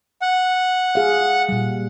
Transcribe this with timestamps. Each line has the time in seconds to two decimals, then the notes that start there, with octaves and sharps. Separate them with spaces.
0.22 F#5
0.95 G#4 F5
1.49 A#2 G3